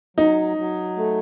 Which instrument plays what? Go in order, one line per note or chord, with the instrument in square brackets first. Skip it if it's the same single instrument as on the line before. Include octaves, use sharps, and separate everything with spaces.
[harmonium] F#3 [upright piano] D#4
[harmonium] F#3
A3